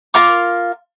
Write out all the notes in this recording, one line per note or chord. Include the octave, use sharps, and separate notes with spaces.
F4 A#4 F5 D6